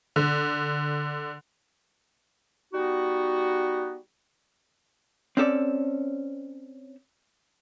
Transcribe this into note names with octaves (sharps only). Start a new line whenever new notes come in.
D3
G3 B3 D#4 F#4
C4 C#4 A4 D5